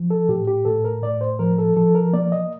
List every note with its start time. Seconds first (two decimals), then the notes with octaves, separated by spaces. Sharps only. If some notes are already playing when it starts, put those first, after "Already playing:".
Already playing: F3
0.10 A4
0.29 A2 G4
0.47 G4
0.65 A2 A4
0.85 A#4
1.03 A2 D5
1.21 C5
1.39 F3 A#4
1.58 A4
1.77 F3 A4
1.95 A#4
2.13 A#3 D5
2.32 D#5